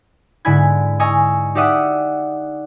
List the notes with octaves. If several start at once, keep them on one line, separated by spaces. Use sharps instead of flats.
G#2 D3 E4 G#5 B5 G#6
D#5 G#5 A#5 C#6 E6
D#4 G4 D5 E5 F#5 D#6